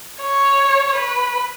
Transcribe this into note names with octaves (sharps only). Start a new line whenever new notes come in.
C#5
B4